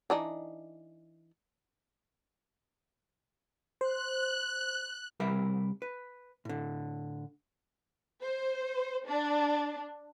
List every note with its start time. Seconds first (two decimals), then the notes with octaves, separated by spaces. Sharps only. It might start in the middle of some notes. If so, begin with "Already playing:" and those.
0.10 E3 D4 D#4
3.81 C5 F#6
5.20 C2 C3 G3 A#4 B4 E5
5.82 B4
6.45 A2 D3
8.24 C5
9.06 D4